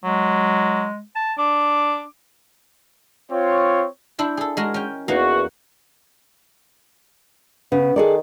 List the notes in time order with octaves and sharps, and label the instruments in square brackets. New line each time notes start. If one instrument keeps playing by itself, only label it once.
[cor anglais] F#3 [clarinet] G#3
[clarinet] A5
[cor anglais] D4 [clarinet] D6
[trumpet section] C4 F4 C#5
[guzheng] D4 E4 C5
G#4 A4
G#3 F#4 A#4
C#4 G5
[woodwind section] E2 F#4 [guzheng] A#3 D#4
[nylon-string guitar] C#3 [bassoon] B3
[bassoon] D#3 [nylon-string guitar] G#4 A4 D5